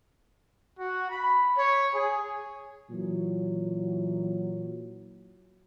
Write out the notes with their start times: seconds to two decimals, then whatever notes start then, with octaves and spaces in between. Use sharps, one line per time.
0.78 F#4
1.09 B5
1.56 C#5
1.94 G#4
2.91 A#2 E3 F#3